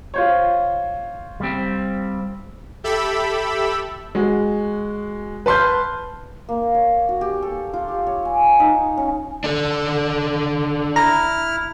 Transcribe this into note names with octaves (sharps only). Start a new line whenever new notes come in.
F4 C5 C#5
G3 C4
G4 A4 E5 B5 E6
G#3 F#4
B4 A5 C6 F6 G6
A#3
C#5
F#4
G4
A4
F4
G4
C#5
G#5
C#5
D#4
C#4
D4 A4
E4 A#5 F6